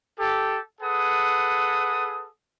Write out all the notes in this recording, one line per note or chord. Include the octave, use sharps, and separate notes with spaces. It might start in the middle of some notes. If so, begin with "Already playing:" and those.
G4 A4
G#4 A4 B4 F#5 D#6